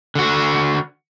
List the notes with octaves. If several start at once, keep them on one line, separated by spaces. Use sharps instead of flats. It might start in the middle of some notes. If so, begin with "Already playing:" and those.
D3 F#4